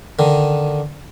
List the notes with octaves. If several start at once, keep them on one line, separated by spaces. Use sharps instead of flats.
D3 D#3